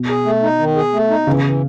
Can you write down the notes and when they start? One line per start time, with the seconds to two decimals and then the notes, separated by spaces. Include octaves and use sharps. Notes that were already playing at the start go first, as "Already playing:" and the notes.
Already playing: B2
0.09 G#4
0.25 A3
0.43 D#4
0.59 D#3
0.76 G#4
0.93 A3
1.10 D#4
1.27 C#3 E3
1.44 E3